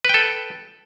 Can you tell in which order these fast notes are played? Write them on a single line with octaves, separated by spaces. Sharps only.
B4 G5 A4